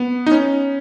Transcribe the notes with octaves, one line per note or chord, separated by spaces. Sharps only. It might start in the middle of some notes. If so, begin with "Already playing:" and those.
Already playing: B3
D#4
C#4